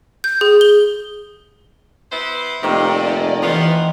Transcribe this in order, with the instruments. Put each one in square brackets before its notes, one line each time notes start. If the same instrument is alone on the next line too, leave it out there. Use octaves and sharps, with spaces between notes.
[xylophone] G6
G#4
G7
[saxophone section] B3 E4 C5
[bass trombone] F1 [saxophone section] C3 [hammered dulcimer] D#3 A#3 C4 [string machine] D5 D#5
[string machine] E3 [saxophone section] F3 B3 F4 [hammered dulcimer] D#5 C6